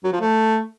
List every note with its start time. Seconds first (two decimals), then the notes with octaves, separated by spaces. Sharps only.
0.04 F#3
0.12 F3
0.21 A3